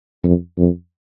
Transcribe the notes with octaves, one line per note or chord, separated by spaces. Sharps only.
F2
F2